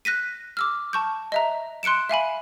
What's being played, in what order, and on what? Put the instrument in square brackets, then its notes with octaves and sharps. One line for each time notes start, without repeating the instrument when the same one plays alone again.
[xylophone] F#6 A#6 B6 D#7
D6 E6 F6
A5 C#6 G6
D#5 E5 A#5
C6 F#6 C#7 D7 E7
E5 F5 G#5 B5